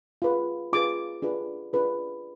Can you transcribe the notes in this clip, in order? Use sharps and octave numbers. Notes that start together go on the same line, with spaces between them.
F4 G#4 B4
F4 G#4 B4 D6
D4 F4 G#4 B4
D4 F4 G#4 B4